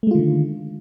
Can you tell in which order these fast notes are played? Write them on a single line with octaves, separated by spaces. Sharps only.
A3 G#3 F4 D#3 D3